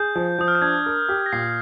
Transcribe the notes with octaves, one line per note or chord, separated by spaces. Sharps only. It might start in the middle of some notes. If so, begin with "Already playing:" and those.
Already playing: G#4 G6
F3
F3 D#6
F6
G6
D4 G#6
A#4
G4
A#6
A#2 C7